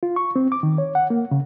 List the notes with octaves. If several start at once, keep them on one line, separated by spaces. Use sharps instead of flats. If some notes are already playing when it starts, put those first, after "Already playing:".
F4
C#6
C4
D6
D#3
C#5
F#5
A#3
C#3